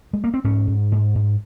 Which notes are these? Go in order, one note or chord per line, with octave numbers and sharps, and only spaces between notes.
G#3
A#3
C4
G#2 C#4
G#2
G#2
G#2